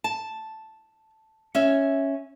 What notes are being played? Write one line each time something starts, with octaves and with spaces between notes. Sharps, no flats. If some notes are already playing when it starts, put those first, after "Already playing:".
A5
C#4 E5